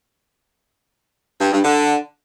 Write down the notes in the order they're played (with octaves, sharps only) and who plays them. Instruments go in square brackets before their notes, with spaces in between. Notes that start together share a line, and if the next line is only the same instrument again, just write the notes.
[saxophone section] G2
G2
D3